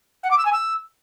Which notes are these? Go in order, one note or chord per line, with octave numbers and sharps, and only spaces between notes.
F#5
D6
E6
G#5
E6